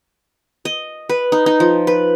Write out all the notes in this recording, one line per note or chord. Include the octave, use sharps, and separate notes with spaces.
D#5
B4
D#4
D#4
F3
B4